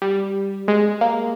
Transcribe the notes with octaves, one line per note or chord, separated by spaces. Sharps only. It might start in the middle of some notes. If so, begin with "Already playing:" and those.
G3
G#3
A#3